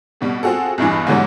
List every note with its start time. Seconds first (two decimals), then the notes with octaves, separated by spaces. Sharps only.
0.21 F2 B2 G3
0.43 C4 F4 F#4 G#4 A4
0.78 B1 E2 G2 E3
1.07 G#2 B2 D3 E3 F#3 G3